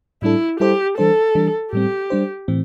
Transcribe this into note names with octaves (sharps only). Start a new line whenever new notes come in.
A2 G3 D4 E4 A4
G3 E4 G4 A4 C5
E3 G3 D4 A4 C5
E3 G3 D4
A2 G3 C4 G4
G3 D4 C5
A2 E3 C4